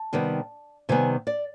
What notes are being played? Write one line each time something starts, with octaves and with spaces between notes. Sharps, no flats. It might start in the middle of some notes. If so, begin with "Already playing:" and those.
Already playing: A5
C3 D#3 G3 B3
C3 D#3 G3 B3 G#5
D5